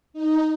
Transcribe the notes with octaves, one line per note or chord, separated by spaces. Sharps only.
D#4